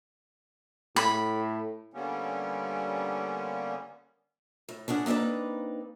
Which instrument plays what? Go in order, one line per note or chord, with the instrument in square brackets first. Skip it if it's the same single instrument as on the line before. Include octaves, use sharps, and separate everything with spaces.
[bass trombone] A2 [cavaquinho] B5
[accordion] D3 G3 A#3 B3 C#4
[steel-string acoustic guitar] A2
C#4 D4 G#4 F#5
A#3 C4 D4 D#4 B4